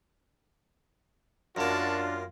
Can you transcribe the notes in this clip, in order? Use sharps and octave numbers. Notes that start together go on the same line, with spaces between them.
F#2 A#3 D4 F4 F#4 E5 A5